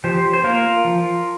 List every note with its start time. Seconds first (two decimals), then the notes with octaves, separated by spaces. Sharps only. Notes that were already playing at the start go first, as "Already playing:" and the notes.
0.04 F3 G4 C5
0.33 C5
0.44 A#3 F4 A#4
0.85 F3